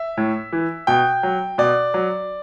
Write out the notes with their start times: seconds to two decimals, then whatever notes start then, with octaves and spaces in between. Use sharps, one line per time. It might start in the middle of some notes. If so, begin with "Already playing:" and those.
Already playing: E5
0.17 A2
0.53 E3
0.87 B2 G5
1.23 F#3
1.58 B2 D5
1.94 F#3